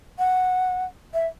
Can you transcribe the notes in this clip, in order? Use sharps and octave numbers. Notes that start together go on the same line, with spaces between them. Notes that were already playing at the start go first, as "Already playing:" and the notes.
F#5
E5